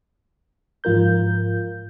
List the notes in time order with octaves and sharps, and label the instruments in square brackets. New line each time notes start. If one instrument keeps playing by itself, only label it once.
[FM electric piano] G#2 F3 F4 A#4 G6